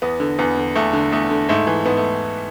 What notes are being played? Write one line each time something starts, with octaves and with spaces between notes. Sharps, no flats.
E2 B3
D3
E2 B3
D3
E2 A3
D3
E2 A3
D3
G#2 A3
E3
G#2 B3
A3